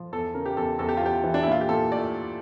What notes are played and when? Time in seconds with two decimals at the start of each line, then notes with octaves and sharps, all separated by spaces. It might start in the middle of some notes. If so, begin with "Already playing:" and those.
Already playing: F3
0.12 E2 A4
0.34 C#3 A#4
0.46 G4
0.56 E2 A4
0.79 E2 A4
0.89 G4
0.97 F4
1.02 E2 G4
1.24 E3
1.34 D4
1.43 E4
1.47 A#2 F4
1.61 G4
1.69 A#2 A4
1.92 A3 D5